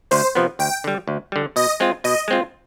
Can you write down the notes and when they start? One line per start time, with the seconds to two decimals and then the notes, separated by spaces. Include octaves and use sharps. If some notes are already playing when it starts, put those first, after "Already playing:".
0.11 D2 C5
0.35 C3 F3 B3
0.59 D2 G5
0.84 D3 G3
1.08 D2
1.32 D3 G3
1.56 B2 D#5
1.80 G#3 C4 F4
2.04 B2 D#5
2.28 G#3 C4 F4